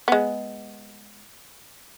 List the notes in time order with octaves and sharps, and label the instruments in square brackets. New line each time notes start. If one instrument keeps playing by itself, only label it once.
[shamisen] G#3 B3